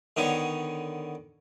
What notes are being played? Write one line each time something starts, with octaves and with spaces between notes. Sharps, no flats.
D3 D#3 B3 C#5